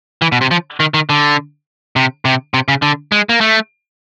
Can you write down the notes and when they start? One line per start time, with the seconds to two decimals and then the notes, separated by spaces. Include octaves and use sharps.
0.22 E3
0.32 B2
0.41 C3
0.51 F3
0.80 D#3
0.94 D#3
1.10 D3
1.96 C3
2.25 C3
2.54 C3
2.68 C#3
2.82 D3
3.12 G#3
3.29 A#3
3.41 A3